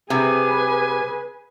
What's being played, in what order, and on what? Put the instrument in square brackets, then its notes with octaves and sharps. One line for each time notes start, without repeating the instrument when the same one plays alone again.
[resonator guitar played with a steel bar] C3 [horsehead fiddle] G#4 B4 [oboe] G#5